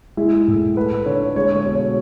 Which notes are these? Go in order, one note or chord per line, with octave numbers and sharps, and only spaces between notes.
G#3 E4
A2
A3 B4
D3 C#5
G#3 C#5
C#5
B2
C#5